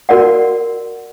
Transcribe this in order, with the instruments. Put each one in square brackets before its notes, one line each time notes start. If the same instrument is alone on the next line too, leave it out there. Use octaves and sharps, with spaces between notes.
[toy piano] F#4 A#4 D5 F#5